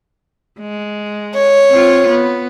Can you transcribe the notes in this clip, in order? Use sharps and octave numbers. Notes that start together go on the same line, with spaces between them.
G#3
C#5
C4 F4
B3